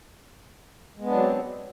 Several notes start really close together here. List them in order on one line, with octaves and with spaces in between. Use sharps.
G#3 B3 D4 F#3 C4